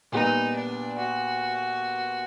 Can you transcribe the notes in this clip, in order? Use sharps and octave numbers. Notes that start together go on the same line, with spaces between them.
A#2 G3 B3 D#4
D4
F#4